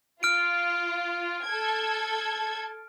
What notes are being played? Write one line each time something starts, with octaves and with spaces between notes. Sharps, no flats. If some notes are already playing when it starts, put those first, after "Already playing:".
F4 F6 D7
A4 G#6